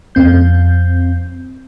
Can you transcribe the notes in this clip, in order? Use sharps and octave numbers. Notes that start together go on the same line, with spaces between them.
F2 C4 G6